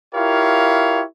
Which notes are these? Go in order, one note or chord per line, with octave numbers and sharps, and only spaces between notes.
E4 F4 G4 A#4 C#5 F5